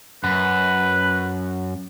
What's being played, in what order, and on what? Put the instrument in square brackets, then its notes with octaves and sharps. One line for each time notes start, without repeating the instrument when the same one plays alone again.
[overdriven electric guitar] F#2 [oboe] B4